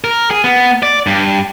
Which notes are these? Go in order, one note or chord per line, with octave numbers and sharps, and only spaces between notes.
A#4
G#4
B3
D5
G2